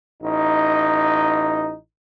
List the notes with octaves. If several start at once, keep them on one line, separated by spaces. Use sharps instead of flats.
A1 D#4